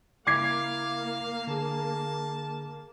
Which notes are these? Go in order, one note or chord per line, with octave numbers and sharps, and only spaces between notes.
C#3 A#3 E4 F5 D6 G#6 C7
D3 G#4 A5